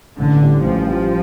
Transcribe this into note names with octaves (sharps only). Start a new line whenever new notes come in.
A1 D3
A2 G3
A1 F3
A2 G3